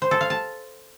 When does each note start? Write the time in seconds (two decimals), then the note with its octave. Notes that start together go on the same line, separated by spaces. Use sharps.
0.02 C5
0.11 A4
0.21 F5
0.30 A5